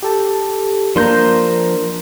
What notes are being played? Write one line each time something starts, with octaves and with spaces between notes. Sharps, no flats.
G4 A4 A5
F3 A#3 D4 A#5 C6 G6